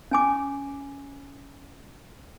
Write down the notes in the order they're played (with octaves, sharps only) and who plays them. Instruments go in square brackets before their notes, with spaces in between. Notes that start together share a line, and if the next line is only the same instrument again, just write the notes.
[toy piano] C#4 G#5 D6